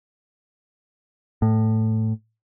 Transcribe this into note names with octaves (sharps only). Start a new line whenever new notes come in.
A2